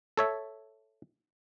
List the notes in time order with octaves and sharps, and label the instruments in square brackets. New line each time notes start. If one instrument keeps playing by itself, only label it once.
[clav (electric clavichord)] A4 C#5 E5